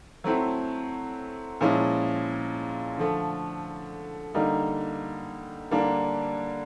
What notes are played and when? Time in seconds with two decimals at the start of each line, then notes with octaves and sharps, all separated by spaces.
0.24 F#3 A3 C4 E4
1.61 A#2 F3 G#3 C#4 E4
2.98 D3 F3 A3
4.34 D3 G3 A#3 D#4
5.71 D3 G3 A#3 D4